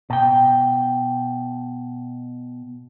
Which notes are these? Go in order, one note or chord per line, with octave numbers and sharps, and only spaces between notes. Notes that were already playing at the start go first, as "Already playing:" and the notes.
B2 G5